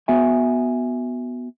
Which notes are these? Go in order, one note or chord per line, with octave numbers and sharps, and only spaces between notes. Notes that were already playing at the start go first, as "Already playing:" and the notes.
B3 F#4 E5 G#5